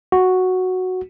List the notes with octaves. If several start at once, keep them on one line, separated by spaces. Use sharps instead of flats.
F#4